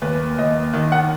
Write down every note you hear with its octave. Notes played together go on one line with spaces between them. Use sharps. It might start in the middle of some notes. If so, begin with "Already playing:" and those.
D#2 B4
D#2 D#5
D#3
F#5